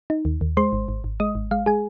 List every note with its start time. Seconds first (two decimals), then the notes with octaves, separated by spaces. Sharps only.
0.10 D#4
0.25 D#2
0.41 D#2
0.57 G#3 C5 C6
0.73 G#1
0.88 G#1
1.04 G#1
1.20 G#3 D#5 D#6
1.35 G#1
1.51 G#3 F5
1.66 G#3 G#4 G#5